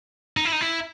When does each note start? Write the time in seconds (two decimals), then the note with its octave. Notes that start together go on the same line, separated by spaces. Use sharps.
0.37 D#4
0.45 E4
0.52 D#4
0.61 E4